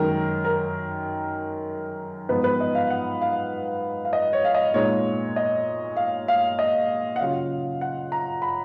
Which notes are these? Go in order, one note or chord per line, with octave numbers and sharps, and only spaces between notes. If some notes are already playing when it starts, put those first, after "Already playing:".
Already playing: F#2 D#3 G#3 D#4 A#4
A#4
G#2 F3 B3 D#4 B4
B4
D#5
F5
F#5
F5
F5
D#5
C#5
F5
D#5
A#2 G#3 D#4 C#5
D#5
F5
F5
D#5
F#5
C#3 F#3 C#4 F4 F5
F#5
A#5
B5